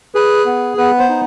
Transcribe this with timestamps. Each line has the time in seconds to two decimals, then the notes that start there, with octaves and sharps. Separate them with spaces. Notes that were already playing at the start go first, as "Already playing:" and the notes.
0.15 G#4 B4
0.46 B3
0.77 B3 B4
0.99 C5
1.09 D#4